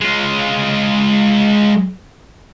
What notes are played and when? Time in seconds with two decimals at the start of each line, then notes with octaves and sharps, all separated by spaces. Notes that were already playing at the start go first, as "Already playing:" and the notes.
0.01 G#3 F4